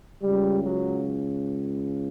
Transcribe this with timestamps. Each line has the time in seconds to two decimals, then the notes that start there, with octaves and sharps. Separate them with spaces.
0.21 C#2 C#3 F#3 G3
0.62 F#3